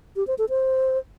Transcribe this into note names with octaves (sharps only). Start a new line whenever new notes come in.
G4
C5
A4
C5